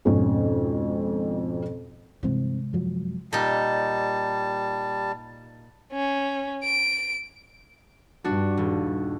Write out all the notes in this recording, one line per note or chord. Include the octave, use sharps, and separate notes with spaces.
G#1 F2 G#2 B2 C#4
G2 C3 E3 G#3 C4
F#2 F3 F#3
A#2 G3 D#4 A5
C#4
D7
G2 D4 F#4
D#1